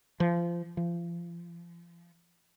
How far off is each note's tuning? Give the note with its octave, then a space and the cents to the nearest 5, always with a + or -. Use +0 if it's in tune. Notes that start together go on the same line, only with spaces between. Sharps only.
F3 -25
F3 -35